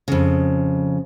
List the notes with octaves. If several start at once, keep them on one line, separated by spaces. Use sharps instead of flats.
F2 C#3